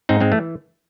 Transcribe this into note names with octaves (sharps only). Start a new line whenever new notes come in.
G#2 C4 D#4
G#3 C4
E3 A3